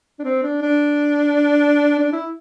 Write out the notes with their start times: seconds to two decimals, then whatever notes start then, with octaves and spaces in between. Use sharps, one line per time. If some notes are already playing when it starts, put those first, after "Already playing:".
0.19 D4
0.24 C4
0.43 D4
0.62 D4
1.99 D4
2.12 E4